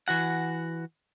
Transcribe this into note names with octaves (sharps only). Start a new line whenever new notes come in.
E3 F#4 F#5